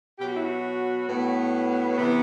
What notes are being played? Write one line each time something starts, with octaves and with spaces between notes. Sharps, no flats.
B2 F#3 G4
F#4
E4
F#4
A2 F#3 B3
C3 E3 B3